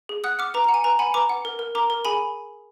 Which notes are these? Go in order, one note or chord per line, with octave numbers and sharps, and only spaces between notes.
G#4
F#5 D#6 F#6
F#5 D6 F6
B4 A#5 D6
A#5
F#5
G#5
B4 A#5
F#5 G#5 B5
B4 A#5 D6
F#5
A#4
A#4
A#4 A#5 D6
A#4
G#4 G#5 B5